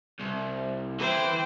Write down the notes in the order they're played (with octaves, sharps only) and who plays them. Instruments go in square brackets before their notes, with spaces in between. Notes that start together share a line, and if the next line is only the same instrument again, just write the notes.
[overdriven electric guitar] C2
[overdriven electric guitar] E3 [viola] C5 G5